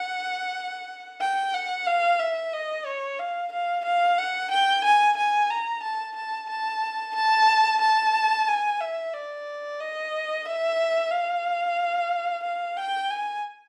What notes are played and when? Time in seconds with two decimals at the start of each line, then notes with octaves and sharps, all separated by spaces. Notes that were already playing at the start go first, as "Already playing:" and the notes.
Already playing: F#5
1.21 G5
1.54 F#5
1.87 F5
2.20 E5
2.53 D#5
2.86 C#5
3.20 F5
3.52 F5
3.85 F5
4.19 F#5
4.51 G5
4.85 G#5
5.17 G#5
5.50 A#5
5.83 A5
6.16 A5
6.50 A5
7.16 A5
7.82 A5
8.48 G#5
8.81 E5
9.14 D5
9.80 D#5
10.46 E5
11.12 F5
12.44 F5
12.77 G5
13.10 G#5